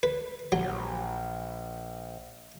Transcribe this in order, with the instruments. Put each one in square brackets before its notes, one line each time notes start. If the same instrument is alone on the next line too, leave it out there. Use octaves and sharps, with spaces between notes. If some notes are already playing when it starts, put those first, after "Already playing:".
[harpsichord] B4
[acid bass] A#1 [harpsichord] F#3